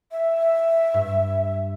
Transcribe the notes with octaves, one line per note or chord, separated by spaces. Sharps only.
E5
G2